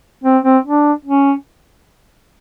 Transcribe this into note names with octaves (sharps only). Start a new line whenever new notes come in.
C4
C4
D4
C#4